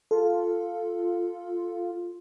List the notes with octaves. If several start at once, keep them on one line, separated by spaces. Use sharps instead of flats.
F4 A4